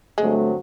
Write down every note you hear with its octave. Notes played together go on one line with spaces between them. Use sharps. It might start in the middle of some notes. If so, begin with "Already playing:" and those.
G2 D3 F#3 G#3 A3 C4